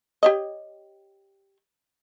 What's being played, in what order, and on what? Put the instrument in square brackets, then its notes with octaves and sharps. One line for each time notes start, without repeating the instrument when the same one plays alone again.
[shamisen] G4 C#5 D#5